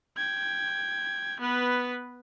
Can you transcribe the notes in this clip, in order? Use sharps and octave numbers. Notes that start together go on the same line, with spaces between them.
G5 G#6
B3 B4